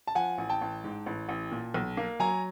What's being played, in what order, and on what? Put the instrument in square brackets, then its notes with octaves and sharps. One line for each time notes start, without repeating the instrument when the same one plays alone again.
[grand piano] A5
[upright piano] F3 [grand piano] F#5 G#5
[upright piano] A1
[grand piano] G5 A5
[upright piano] A1
G#2
A1
A1
A#2
B1
A#3
[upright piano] F#3 [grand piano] G#5 A#5